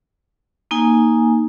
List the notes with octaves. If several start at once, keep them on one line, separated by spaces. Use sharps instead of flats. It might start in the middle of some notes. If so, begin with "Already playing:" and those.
A#3 D#4 G#5